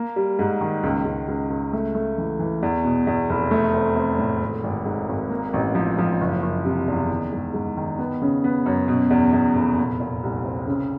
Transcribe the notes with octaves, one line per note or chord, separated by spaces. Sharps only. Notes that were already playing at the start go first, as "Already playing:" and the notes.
Already playing: A#3
G3
G#2
D#3
C#2
C#2
C#2
C#2
A3
A3
E3
E3
E2
B2
E2
F1
A3
C4
C4
A2
G#1
G#1
G#2
G#1
A#3
A1
F3
F3
F#1
F#1
C3
E2
D#3
G#2
G#2
D#3
B3
C#3
B3
F#2
B2
E2
E2
F1
A#2
A#2
C2
C4
C#3